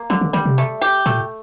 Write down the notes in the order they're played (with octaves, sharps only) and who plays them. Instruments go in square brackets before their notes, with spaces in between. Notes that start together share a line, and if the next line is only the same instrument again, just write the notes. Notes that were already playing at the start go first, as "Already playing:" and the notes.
Already playing: [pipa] A#3
[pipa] D3 [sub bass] F3
[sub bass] D#3
[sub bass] D#3 [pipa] G3
[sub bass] C3
[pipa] A3
G4
[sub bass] A#2 [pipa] A3